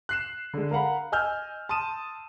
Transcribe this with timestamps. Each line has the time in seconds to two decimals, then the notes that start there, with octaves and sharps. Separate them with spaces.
0.09 F#6 C7 E7
0.54 D3 G#3
0.71 A#4 F5 F#5 B5
1.12 D#5 G#5 E6 F6 G6
1.69 A5 C6 D#6 D#7 E7